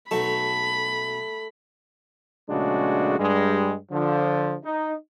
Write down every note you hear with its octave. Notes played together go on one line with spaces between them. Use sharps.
B1 F#3 A3 A5 B5
A#1 C#3 G#3 A3 D4 F#4
G2 G3 G#3
D3 F3
D#4